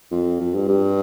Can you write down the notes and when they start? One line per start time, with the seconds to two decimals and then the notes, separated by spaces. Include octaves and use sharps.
0.11 F2
0.40 F2
0.55 G2
0.68 G2